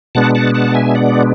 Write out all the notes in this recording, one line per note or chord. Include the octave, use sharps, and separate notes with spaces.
B2 G#3 B3 D4 F#5 A5
F#5 A5
F#5 A5
E5 G#5
D5 F#5